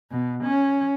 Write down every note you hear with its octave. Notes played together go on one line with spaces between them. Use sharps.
B2
C#4